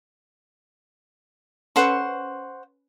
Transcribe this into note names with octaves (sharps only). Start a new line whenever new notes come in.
C#4 A4 B4 C5 F#5 C#6